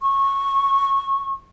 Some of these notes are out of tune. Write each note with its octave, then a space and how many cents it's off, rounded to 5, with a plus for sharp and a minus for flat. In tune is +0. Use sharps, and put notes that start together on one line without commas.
C#6 -15